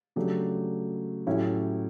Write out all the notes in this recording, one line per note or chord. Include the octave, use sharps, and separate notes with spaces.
C#3 F#3 A3 D4 G4
A2 F#3 C#4 E4 G4